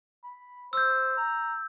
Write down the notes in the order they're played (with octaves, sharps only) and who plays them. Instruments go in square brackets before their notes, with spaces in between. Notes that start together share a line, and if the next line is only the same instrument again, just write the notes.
[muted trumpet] B5
[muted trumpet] C5 [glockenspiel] E6 G6
[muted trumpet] A#5